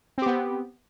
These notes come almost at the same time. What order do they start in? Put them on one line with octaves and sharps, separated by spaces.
C4 G4 B3